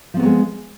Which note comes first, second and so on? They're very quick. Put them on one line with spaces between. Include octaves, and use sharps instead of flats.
F3 C4 B3 F#3 G#3